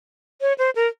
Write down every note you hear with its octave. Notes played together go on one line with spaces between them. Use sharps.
C#5
C5
A#4